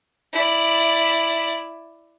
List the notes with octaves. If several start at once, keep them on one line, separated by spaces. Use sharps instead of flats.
E4 D5